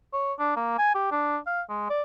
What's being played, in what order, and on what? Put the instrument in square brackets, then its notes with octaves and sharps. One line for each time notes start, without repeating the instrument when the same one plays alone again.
[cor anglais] C#5
D4
A#3
G#5
G4
D4
F5
G#3
D5